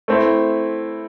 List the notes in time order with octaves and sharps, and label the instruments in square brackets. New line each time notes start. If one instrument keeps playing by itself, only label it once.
[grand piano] A3 C4 E4